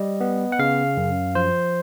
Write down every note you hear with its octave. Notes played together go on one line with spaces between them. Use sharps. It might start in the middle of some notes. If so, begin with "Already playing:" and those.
Already playing: G3 D#5
B3
F#5
C#3 F5
F#2
F3 C5